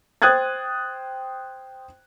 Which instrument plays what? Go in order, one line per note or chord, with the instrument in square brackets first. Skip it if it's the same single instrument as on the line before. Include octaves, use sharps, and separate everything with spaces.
[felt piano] C5 G5 D#6 F#6 G#6 A6